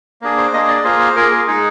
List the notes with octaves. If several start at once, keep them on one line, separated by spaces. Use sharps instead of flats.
A#3 D4 G#4
C5
A#3 D4 G#4 D#5
D5
A#3 F4 G#4 C5
C5
A#3 F4 G#4 A#4
G#4
G#3 D#4 G#4